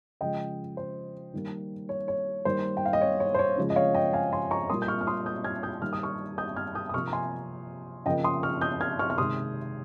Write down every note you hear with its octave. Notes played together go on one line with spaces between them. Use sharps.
C#3 F3 G#3 D#5 G5
C5
D#3 G3 A#3
C#5
C#5
D#3 G3 A#3 C5
G5
F5
D#5
C#5
C#5
C5
C#5
C#3 F3 G#3
D#5
C#5 F5
D#5 G5
F5 G#5
G#5 C6
A#5 C#6
A#2 G3 A#3 C6 D#6
G6
C#6 F6
F6
C6 D#6
D#6 G6
F6 G#6
D#6 G6
D#3 G3 A#3 F6
D#6
C#6 F6
D#6 G6
F6 G#6
D#6 G6
D#6
C3 F3 A#3 C#6 F6
A#5
G#5 C6
C#3 F3 A#3 D#5 G5
C6 D#6
C#6 F6
D#6 G6
F6 G#6
C#6 F6
F6
C3 D#3 G#3 C6 D#6